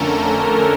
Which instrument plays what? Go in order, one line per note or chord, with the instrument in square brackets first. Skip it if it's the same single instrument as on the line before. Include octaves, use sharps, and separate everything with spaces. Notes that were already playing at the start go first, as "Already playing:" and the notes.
Already playing: [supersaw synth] F2 D3 A3 C#4 A4 A#4